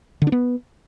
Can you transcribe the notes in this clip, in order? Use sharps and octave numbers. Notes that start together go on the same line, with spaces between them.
D3
D4
B3